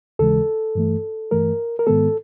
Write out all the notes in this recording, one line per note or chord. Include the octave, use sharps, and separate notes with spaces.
D#2 C#3 E3 G#3 A4
G2 E3 A3
G2 E3 A3 A#4
A#4
G#2 D#3 G#3 B3 A4